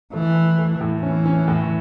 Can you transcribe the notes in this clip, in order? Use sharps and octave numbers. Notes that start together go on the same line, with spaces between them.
E3 A3
E4
A3
A2
E3 C#4
C#4
A2